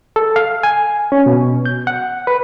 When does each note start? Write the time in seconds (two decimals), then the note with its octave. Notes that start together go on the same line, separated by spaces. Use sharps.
0.16 A4
0.36 F5
0.63 G#5
1.12 C#4
1.26 B2
1.66 G6
1.87 F#5
2.27 B4